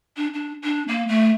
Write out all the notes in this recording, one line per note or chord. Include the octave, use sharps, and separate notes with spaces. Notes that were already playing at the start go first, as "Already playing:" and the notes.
D4
D4
D4
A#3
A3